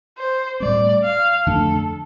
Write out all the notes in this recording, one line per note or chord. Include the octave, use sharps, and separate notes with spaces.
C5
A2 G3 C4 D5
F5
F2 D3 A3 D4 A4